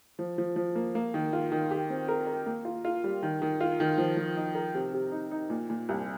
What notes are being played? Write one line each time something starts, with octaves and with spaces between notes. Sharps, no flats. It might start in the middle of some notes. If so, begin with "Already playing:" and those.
F3
F3
F3
A#3
A#3
D#3
F4
D#3
G4
C4
A#4
A#4
A#3
F4
F4
G3
D#3
D#3
F4
D#3
F3
F3
D#4
A#4
C3
C3
D#4
D#4
A#2
A#2
C2